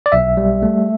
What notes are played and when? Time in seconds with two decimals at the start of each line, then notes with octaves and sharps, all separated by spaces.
0.06 D5
0.12 B1 E5
0.37 G3
0.63 A3